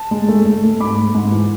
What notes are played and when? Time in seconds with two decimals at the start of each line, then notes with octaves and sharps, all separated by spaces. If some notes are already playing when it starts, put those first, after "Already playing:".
Already playing: A5
0.11 G#3
0.29 A3
0.45 A3
0.64 A3
0.80 G#2 B5 D6
0.98 A3
1.15 G#2
1.32 E3